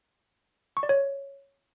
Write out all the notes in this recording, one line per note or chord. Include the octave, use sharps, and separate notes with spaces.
C#6
D5
C#5